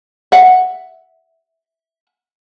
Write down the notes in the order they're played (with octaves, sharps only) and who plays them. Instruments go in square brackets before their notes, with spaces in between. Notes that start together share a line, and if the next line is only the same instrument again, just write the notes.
[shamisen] E5 F#5